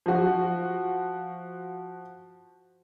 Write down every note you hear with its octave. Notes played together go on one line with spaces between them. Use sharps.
F3 F#4